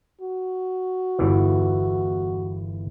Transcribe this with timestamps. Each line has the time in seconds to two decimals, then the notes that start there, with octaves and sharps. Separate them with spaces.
0.22 F#4
1.19 G1 E2 E3